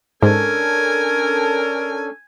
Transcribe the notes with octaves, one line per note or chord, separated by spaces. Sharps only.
G#2 C#4 D4 A4 A#4 G#5